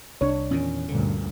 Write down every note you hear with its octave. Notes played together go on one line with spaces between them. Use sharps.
C2 D4 C#5
E2 A#2 D#3 C#4
D2 G2 A#2 D3